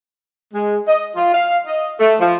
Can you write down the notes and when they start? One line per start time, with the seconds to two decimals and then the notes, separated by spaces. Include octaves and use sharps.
0.54 G#3
0.88 D#5
1.16 F4
1.35 F5
1.67 D#5
1.99 A3
2.21 F3